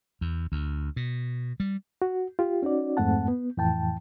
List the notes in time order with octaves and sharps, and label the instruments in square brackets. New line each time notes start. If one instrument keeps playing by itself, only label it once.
[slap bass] E2
D2
B2
G3
[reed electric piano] F#4
F4 G4
C#4 D#4 F#4 D5
F2 G#2 A3 C4 F#5 A5
B3
F2 A2 E3 G5 A5